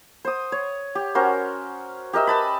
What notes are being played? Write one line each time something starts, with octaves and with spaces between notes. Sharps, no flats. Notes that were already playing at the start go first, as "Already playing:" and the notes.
C5 D#6
C#5
G4
C#4 F#4 A#4 C5
G4 A#4 D#5 E5
B4 A5 B5